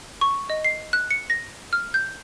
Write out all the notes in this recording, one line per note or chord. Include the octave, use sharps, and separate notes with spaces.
C#6
D#5
C7
F#6
C#7
A#6
F6
G6